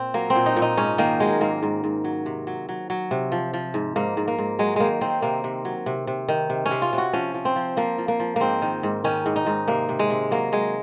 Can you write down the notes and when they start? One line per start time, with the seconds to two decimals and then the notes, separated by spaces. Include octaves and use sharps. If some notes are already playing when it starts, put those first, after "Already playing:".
Already playing: A#2 C4
0.14 F#3 A#3
0.30 C4
0.35 A#2
0.46 D#4
0.56 A#2
0.62 D#4
0.77 G#2 C#4
0.98 D#3 A#3
1.20 F#3 G#3
1.41 G#2 A#3
1.63 G#2
1.84 G#2
2.04 F#3
2.26 C3
2.47 F#3
2.69 F#3
2.90 F#3
3.11 C3
3.32 F3
3.53 F3
3.74 G#2
3.96 G#2 A#3
4.17 G#2
4.28 A#3
4.38 G#2
4.59 F#3 G#3
4.76 D#3 G#3 A#3
5.01 D#3 C4
5.22 C3 A#3
5.44 C3
5.65 F#3
5.86 C3
6.07 C3
6.28 D#3
6.50 C3
6.66 C#4
6.71 C3
6.82 F4
6.93 C3
6.98 F#4
7.13 F3 C#4
7.34 F3
7.45 C4
7.56 F3
7.77 F3 A#3
7.98 F3
8.08 A#3
8.20 F3
8.36 G#2 A#3 C4
8.62 D#3
8.83 G#2
9.04 D#3 C#4
9.26 G#2
9.36 D#4
9.47 G#2
9.67 C3 A#3
9.89 C3
9.99 G#3
10.10 C3
10.31 F#3 A#3
10.52 F#3 G#3